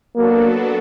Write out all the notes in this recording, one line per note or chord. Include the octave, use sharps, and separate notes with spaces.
F#3 A#3 B3 D4 F#4 A4